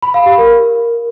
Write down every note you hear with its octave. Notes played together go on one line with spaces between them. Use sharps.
B5
F5
G4
A#4